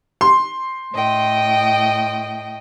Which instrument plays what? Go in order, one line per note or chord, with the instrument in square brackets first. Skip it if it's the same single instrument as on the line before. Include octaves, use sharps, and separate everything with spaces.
[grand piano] C6
[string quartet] A2 D#5 G5